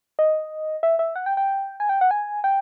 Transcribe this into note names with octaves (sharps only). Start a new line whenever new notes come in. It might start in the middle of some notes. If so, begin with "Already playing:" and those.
D#5
E5
E5
F#5
G5
G5
G#5
G5
F#5
G#5
G5